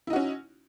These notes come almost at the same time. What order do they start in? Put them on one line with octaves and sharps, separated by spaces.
E4 D#4 F#4 C#4